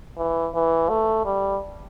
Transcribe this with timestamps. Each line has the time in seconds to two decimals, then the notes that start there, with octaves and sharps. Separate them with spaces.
0.17 E3
0.54 E3
0.89 A3
1.25 G3